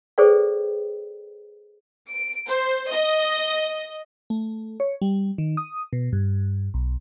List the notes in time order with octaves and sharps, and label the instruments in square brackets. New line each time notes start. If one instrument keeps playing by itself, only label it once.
[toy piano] G#4 A4 B4 C5 D5 G5
[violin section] D7
C5
D#5
[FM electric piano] A3
C#5
G3
D#3
D#6
B2
G2
B1